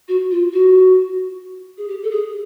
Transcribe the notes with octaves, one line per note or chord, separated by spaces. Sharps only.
F#4
F4
F#4
G#4
G4
A4
G#4